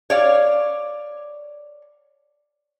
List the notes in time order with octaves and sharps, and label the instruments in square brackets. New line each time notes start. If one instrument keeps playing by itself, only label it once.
[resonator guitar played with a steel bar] C#5 D5 F5